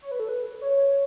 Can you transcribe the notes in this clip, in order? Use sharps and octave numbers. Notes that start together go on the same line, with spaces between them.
C#5
B4
A4
B4
C#5